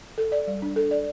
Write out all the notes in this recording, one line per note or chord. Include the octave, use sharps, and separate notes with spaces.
A4
D5
G3
D4
A4
D5